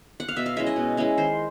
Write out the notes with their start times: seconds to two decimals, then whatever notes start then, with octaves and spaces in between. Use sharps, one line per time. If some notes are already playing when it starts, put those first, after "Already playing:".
0.20 F#5
0.28 F5
0.36 B2 E5
0.46 F5
0.56 G#3 C#4 E4 E5
0.67 D#5
0.76 B2
0.97 G#3 C#4 E4
1.17 D#3 C5